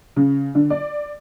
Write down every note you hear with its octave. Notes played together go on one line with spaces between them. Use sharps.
C#3
D3
D5